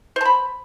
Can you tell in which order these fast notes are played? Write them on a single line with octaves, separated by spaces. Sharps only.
C5 A5 B5